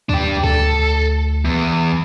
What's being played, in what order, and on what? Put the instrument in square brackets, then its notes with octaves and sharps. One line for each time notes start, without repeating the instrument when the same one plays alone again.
[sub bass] D#2 [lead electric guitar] D4 G4
[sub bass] D2 [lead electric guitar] A4
[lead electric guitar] E2